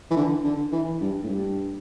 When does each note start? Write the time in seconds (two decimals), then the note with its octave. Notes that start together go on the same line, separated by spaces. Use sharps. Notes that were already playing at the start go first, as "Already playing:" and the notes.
0.11 E3
0.17 D3
0.45 D3
0.73 E3
1.01 G2
1.23 A2
1.29 G2